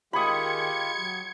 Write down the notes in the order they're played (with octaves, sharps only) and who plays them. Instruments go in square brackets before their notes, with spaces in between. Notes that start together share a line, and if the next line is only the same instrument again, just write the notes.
[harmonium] D#3 G#3 [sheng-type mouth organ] F4 G4 [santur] B5 D#6 [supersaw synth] G#6 C#7
[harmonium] F#3